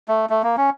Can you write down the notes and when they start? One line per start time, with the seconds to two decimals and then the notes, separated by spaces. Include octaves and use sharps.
0.08 A3
0.30 A3
0.43 A#3
0.57 C#4